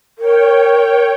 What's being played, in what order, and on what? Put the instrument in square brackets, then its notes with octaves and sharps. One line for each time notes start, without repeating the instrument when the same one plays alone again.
[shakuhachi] A#4 [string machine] C#5 G5